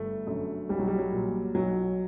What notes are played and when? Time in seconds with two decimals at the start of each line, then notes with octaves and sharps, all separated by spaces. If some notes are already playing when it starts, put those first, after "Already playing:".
Already playing: G1 A3
0.27 F#2 D3
0.69 B1 G3
0.79 F#3
0.88 G3
0.98 F#3
1.12 A#2
1.55 B1 F#3